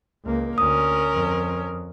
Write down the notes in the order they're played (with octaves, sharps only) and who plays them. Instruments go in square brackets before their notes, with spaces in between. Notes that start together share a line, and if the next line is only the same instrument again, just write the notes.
[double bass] C#2 A#3
[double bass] D2 [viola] C#4 A#4 [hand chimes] D#6
[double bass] F2